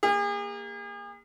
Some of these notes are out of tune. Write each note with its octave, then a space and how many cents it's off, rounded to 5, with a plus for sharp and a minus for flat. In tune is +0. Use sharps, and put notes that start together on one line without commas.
A#3 +0 G#4 -40